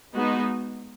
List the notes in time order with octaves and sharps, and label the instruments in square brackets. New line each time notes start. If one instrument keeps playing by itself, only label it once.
[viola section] G#3 B3 D#4 F#4